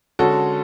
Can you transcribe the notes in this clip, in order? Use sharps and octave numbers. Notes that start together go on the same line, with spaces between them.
D3 G#3 C#4 F#4 A4